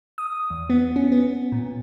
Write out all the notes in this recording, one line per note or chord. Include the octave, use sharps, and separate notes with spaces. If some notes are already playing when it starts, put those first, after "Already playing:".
D#6
E2
B3
C#4
B3
A#2